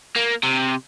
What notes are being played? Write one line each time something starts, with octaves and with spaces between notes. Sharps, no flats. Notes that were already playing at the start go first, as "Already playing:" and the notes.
A#3
C3